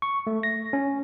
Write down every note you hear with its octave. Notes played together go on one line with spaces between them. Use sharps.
C#6
A3
A#6
C#4